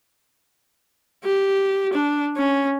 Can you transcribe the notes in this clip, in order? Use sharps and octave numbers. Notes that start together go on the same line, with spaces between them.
G4
D4
C#4